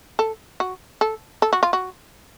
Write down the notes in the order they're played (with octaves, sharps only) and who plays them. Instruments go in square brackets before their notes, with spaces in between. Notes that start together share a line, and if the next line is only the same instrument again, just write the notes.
[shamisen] A4
F#4
A4
A4
F#4
F4
F#4